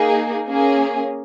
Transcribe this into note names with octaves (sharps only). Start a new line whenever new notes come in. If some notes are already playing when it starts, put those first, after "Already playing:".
Already playing: A#3 D#4 G#4
A#3 C#4 G#4